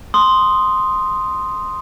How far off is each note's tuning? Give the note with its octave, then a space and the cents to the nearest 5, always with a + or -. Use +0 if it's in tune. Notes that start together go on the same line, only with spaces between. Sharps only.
C6 +0 D#6 +0